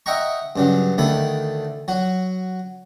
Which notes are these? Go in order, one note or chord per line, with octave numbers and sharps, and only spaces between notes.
D#5 E5 F#5 G5 A#5 C#6
G2 C#3 F#3
D2 D#3 A3 A4 B5
F#3 F#4